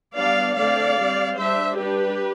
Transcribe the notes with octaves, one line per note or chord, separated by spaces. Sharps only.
G3 B3 D4 D5 F5
D3 A3 C4 D5 F5
G3 C4
G3 D4 C5 E5
G3 D4 G4 B4